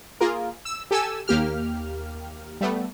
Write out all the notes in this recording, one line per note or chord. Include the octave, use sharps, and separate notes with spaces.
A#3 F4 G#4 A#4
E6
G4 A4 G#5 E6
D#2 A#3 G4 F6
G3 A3 B3